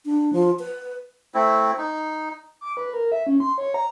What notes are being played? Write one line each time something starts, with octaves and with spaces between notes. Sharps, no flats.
D4
F3
B4
A3 C4 E4
D#4
D6
B4
A#4
E5
C#4
C6
C#5
A#5